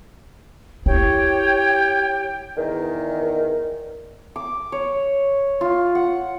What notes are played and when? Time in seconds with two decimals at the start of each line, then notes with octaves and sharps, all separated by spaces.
0.86 E4 G4 C#5 G5
2.55 E2 D#3
4.36 D6
4.72 C#5
5.61 F4
5.95 F#5